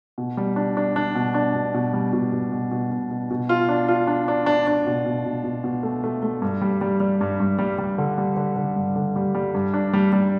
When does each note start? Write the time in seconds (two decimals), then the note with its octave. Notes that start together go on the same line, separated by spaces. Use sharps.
0.18 B2
0.37 G3
0.56 D4
0.77 D4
0.96 D4
1.15 B2
1.34 D4
1.55 B2
1.74 B2
1.93 G3
2.13 B2
2.32 B2
2.52 B2
2.71 B2
2.91 B2
3.11 B2
3.31 B2
3.49 F4
3.69 D4
3.88 F4
4.07 D4
4.28 D4
4.46 D4
4.67 D4
4.87 B2
5.05 B2
5.25 B2
5.44 B2
5.64 B2
5.83 A3
6.04 A3
6.23 A3
6.42 G2
6.61 G3
6.81 G3
7.00 G3
7.21 G2
7.40 G2
7.59 G3
7.78 G3
7.98 D3
8.18 G3
8.37 D3
8.56 D3
8.76 G2
8.96 D3
9.16 G3
9.35 G3
9.54 G2
9.74 D4
9.93 G3
10.13 G3